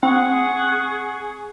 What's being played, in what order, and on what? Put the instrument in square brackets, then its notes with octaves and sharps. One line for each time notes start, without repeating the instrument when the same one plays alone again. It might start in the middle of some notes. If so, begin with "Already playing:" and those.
[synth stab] C4 [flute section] G#4 C#6 [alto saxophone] F#5